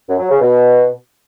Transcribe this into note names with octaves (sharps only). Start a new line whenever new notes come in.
F#2
F#3
C#3
B2